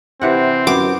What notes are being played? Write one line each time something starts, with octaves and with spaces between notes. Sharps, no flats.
C3 E3 C4 F#5
F#2 B3 D6